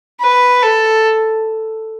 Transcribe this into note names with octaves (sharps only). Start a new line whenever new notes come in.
B4
A4